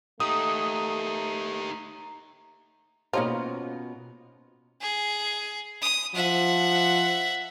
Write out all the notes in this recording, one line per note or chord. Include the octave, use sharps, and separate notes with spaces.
A3 D#4 G4 A#5 D#6
B2 A#3 C#4 D#4 F4 C5
G#4
D#6
F3 E5 F#5